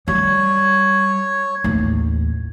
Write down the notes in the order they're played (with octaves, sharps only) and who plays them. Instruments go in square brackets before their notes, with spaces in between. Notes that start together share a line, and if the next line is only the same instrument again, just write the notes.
[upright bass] G3 [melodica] C#5
[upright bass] A1 D#2